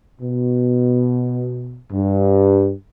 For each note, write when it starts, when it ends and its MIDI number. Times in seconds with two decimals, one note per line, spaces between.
0.21 1.80 47
1.92 2.71 43